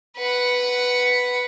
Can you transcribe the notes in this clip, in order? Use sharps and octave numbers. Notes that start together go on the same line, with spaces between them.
B4 F#5